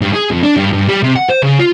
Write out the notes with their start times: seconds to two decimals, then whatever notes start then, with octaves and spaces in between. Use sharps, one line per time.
0.02 G2
0.13 G#4
0.31 F2
0.43 D4
0.57 G2
0.73 G2
0.89 G3
1.03 C3
1.16 F#5
1.30 C5
1.43 C#3
1.59 F4